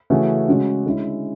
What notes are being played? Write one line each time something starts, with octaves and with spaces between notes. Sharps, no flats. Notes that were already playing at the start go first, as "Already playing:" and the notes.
C#3 E3 A3 C#4 F#4
C#3 G#3 C#4 F#4
D3 G#3 C#4 E4